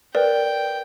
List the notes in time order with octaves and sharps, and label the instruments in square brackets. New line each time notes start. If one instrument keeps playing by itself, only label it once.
[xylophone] A#4 B4 D5 [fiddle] G5